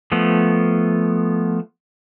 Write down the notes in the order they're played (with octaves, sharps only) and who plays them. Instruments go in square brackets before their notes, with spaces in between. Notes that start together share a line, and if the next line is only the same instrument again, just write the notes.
[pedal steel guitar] F3 A3 B3